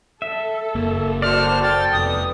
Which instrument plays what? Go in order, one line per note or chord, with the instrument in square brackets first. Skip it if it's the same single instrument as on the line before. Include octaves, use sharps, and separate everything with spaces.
[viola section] A4 [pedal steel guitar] E5
[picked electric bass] F#1 A#3
[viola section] F#4 C5 [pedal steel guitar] A4 D5 [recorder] F6
[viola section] G5 [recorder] A6
[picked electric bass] F1 [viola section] B3 [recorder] D#6